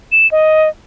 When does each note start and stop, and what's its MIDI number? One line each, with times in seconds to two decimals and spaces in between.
0.12 0.30 100
0.32 0.69 75